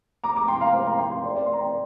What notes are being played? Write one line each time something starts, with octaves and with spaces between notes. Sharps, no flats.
A#5 D6
A#5 D6
G5 C6
F5 A#5
C5 F5
F5 A#5
G5 C6
G5 C6
D5
D5
C6
A#5
D5 G5